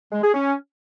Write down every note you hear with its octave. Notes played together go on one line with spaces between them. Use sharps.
G#3
G#4
C#4